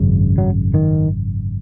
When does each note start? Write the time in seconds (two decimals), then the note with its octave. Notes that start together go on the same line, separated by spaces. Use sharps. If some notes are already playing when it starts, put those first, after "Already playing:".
Already playing: G#1 F#2 C#3
0.38 F#3
0.74 D#3